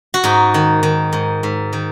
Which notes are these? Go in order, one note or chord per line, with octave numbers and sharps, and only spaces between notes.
F#4
G#2 D#4
D#3
D#3
G#2
G#2
D#3